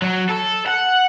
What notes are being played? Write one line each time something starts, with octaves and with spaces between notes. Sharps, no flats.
F#3
A4
F#5